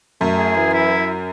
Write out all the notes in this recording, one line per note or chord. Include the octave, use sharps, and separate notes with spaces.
F#2 A3
G#4
E3
E4